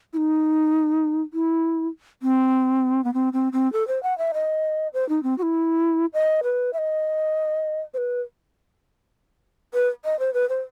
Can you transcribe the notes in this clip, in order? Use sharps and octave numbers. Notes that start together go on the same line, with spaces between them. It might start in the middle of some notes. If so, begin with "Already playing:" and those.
E4
D#4
E4
C4
B3
C4
C4
C4
A4
C5
F#5
E5
D#5
C5
D#4
C4
F#4
E4
D#5
B4
E5
D#5
C5
B4
B4
D#5
C5
B4
C5